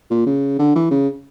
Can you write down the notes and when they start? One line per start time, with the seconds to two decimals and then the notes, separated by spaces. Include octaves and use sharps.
0.11 A#2
0.26 C#3
0.59 D3
0.75 E3
0.91 C#3